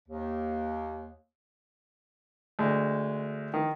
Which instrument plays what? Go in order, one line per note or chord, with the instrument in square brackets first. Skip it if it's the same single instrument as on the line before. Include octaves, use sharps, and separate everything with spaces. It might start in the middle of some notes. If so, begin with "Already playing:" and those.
[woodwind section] D#2
[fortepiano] D2 G#3
D#3